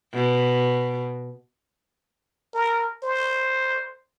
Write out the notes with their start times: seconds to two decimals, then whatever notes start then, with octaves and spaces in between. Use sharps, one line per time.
0.13 B2
2.54 A#4
3.03 C5